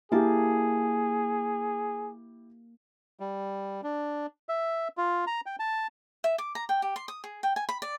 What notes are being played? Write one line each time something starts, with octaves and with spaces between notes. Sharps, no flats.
A#3 E4 G4 G#4 A5
G3
D4
E5
F4
A#5
G5
A5
E5
D6
A#5
G5
G4
C6
D#6
G#4
G5
G#5
B5
D5